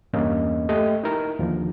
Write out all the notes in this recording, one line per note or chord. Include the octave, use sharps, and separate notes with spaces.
E2 G2 A#3 C#4 D#5
A3 G4 D#5
D#4 E4 A#4
D#2 D3 F3